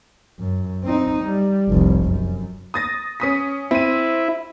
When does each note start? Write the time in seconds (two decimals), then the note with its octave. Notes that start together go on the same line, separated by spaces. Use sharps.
0.39 F#2
0.83 C4 D#4
1.24 G3
1.69 F1 C2
2.03 F#2
2.74 D#6 A6 A#6
3.20 C#4 D#6 B6
3.71 C4 E4 D#7